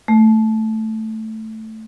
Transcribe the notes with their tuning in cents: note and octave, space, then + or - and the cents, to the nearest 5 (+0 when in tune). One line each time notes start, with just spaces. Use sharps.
A3 +0